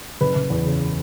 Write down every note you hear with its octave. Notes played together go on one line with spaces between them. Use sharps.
F#1 B4
F#1
E2
C#3